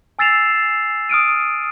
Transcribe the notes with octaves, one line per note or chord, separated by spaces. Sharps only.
G#5 E6 A6 C7 E7 F7
D#6 F6 D7 D#7